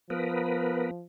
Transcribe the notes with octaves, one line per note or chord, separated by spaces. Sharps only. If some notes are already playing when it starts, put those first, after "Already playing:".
F3 B3 A#4 B4